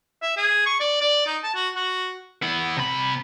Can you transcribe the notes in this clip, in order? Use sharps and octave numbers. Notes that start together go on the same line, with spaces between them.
E5
G#4
C#6
D5
D5
D#4
A5
F#4
F#4
B3 E4
C3 B5